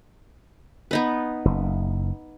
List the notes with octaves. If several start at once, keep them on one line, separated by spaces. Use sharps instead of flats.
B3 D#4 B4
F#1